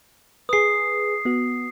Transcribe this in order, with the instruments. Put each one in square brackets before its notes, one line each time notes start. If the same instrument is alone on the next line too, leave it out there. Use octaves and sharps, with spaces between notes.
[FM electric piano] G#4 B4 [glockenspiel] D#6 C7
[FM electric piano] B3 F#4